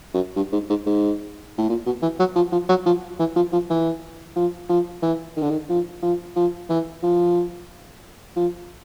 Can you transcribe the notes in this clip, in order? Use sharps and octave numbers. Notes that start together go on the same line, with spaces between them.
F#2
G2
G#2
G#2
G#2
A2
A#2
B2
E3
F#3
F3
F3
F#3
F3
E3
F3
F3
E3
F3
F3
E3
D#3
D3
D#3
F3
F3
F3
E3
F3
F3